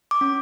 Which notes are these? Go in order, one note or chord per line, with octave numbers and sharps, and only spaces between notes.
D6
C#4